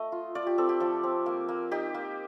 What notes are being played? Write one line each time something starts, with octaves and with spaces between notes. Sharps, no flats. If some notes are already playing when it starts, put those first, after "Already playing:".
Already playing: A3 D#5
F4
F4 D5
G4
C4 A4
G4
F3 A4
C4
A#3
A#3
D#4 G4
A#3